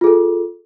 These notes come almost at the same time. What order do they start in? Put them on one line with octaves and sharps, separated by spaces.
F4 G#4 A4